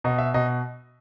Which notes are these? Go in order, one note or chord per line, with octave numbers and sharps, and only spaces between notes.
B2 D#5
E5
B2 D#5